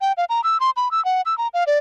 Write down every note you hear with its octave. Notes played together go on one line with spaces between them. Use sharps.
G5
F5
A#5
E6
C6
B5
E6
F#5
E6
A#5
F5
D5